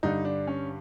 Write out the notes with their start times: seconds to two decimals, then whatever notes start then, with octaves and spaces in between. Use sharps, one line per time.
0.03 G2 D3 G3 D#4
0.25 D4
0.47 C#4